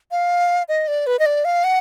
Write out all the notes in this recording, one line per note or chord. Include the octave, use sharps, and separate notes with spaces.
F5
D#5
D5
B4
D#5
D5
F5
F#5